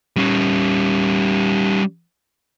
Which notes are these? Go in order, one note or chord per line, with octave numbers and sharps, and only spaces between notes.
G3 C#4